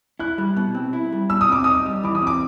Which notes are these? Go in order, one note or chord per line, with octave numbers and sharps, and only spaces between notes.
E4 F#6
G3
B2
C4
E4
G3
B2 E6
D#6
C4 D6
D#4 D#6
G3
E3 D6
D#6
C4
D6